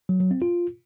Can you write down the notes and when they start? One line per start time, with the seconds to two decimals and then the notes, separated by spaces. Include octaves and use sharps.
0.09 F#3
0.20 F#3
0.31 C4
0.42 F4